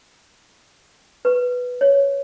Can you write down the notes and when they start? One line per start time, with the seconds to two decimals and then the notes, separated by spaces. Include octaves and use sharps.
1.25 B4
1.81 C#5